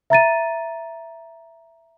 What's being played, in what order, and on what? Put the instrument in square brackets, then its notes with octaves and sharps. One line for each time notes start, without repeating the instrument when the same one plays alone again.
[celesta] E5 A#5 A6 D#7